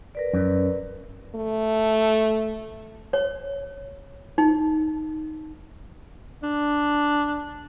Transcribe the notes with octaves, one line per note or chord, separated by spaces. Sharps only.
A#4 B4 D5
F#2
A3
C#5
D#4
D4